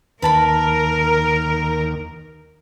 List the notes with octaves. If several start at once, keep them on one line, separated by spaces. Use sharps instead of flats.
D#2 A#4 B4 A5 B5